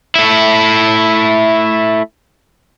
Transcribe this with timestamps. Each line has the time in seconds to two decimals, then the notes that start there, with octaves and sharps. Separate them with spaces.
0.16 A3 E4